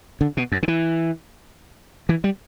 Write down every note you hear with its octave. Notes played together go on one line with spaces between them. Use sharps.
D3
B2
F#2
D3
E3
E3
G3